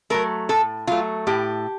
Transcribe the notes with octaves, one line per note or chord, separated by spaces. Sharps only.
F#3 A3 A#4
A2 A4
F#3 A3 F4
A2 G4